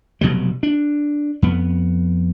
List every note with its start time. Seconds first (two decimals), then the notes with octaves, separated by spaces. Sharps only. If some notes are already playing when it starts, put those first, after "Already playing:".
0.21 F1 B2 F#3 G3
0.63 D4
1.42 F2 B3